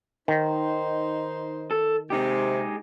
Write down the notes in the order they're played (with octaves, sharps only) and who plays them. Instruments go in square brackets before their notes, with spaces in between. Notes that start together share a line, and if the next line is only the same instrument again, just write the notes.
[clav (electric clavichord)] D#3 [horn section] D#4 C5
[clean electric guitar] A4
[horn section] C3 [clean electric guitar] G#3 D#4 G4